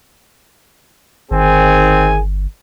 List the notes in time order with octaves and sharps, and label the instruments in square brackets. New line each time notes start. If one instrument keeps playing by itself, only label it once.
[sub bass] G1 [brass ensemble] D#3 G#4 G#5 [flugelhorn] C4